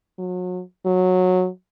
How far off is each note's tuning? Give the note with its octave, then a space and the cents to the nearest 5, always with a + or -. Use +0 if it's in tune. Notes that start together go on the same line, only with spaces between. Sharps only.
F#3 -35
F#3 -15